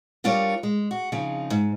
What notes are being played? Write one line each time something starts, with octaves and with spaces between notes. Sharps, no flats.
G3 D4 F4 A#4 C#5
G#3
F#4
C#3 F3 C4 D#4
G#2